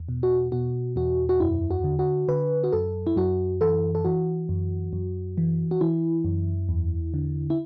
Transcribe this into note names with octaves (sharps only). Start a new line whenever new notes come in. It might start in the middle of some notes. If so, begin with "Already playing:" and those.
Already playing: E2
B2
F#4
B2 F#4
E2 F#4
F#4
F#2 E4
F#4
D3
F#4
D3 B4
F#4
F#2 A4
E4
F#2 F#4
E3 A4
A4
E3 F#4
F#2
F#2
E3
F#4
E3 E4
F#2
E2
D3
E4